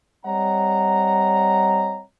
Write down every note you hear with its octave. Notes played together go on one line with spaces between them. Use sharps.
G3 C4 C#5 D#5 F#5 A#5